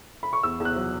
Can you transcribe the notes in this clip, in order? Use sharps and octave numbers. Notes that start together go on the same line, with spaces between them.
B5
C#6
E2 E6
E2
F#6
F#3